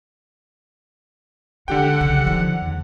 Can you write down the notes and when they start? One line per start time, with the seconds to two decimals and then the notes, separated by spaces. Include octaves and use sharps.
1.68 D3 G#3 G4 F#5 G5
2.01 B1 C#3
2.25 D2 D#3 F3
2.61 E2